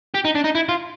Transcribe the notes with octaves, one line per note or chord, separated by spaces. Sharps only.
G4
D#4
D4
D#4
E4
F4